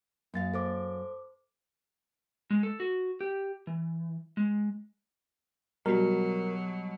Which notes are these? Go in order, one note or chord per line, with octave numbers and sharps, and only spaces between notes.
F#2 A#3 F5 A6
A4 C5 D6
G#3
A4
F#4
G4
E3
G#3
B2 F#3 G3 A#4